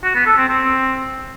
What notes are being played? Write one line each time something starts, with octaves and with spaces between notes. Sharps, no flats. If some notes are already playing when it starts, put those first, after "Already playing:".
F#4
B3
A4
C4
C4